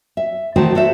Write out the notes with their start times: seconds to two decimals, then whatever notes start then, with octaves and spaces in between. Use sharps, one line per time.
0.17 E5
0.56 D#3 E3 A3 F#4 C5 A5
0.75 F#4 A4 C5 E5